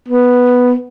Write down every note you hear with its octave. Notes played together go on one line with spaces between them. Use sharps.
B3